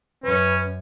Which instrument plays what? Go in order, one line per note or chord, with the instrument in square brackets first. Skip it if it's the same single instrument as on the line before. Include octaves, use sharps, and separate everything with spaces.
[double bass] F#2 [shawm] C#4 [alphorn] B4